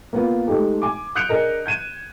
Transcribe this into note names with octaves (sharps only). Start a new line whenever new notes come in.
A#3 B3 F4
G#3 A3 D#4 G4 A4
G#5 D6
D#6 F#6 G6 C#7 D7 F7
D4 G#4 A#4 D#5
G6 G#6 D#7 E7